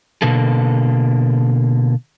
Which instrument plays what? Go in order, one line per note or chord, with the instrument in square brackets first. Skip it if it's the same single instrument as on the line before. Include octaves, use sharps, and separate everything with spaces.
[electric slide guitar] B2 D3 A#3 A4